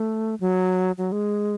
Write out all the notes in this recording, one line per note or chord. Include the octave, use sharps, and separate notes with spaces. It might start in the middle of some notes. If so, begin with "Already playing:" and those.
Already playing: A3
F#3
F#3
G#3